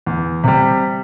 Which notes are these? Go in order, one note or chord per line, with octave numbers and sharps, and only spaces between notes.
E2
C3 G3